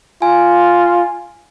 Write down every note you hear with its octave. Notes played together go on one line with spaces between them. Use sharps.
F4 G#5